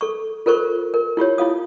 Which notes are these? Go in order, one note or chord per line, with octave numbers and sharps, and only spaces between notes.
A4 C#6
F4 A4 A#4 C5 C#6
A#4
E4 F4 G4 C#5
E4 F4 F5 D#6